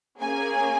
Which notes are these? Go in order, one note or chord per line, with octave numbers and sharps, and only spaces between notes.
A#3 C#4 G#4 G#5